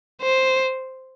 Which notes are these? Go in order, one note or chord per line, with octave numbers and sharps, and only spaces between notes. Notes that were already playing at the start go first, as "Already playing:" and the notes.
C5